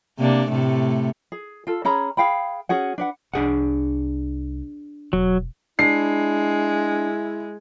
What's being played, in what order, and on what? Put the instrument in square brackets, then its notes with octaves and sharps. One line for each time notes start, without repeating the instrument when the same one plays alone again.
[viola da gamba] C3 A#3 D4
A2 C3 A3
[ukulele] G#4
F4 A4
C#4 G#4 A#5 B5
G#4 F5 G5 B5
C#4 F#4 G#4 F#5
D4 B4 F#5
[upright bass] C2 [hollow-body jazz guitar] D4 G#4 F#5
[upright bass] E1 [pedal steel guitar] F#3
[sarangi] G#3 [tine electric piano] D4 [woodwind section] E4 [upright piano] C7